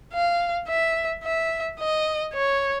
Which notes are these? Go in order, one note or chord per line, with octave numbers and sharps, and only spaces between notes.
F5
E5
E5
D#5
C#5